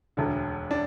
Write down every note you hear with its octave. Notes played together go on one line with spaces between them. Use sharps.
E1 D2 D3
D4